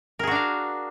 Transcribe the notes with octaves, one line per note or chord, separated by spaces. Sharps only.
D4 F#4 G#4 A#4 F5